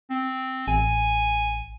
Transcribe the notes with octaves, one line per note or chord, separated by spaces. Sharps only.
C4
A1 G#5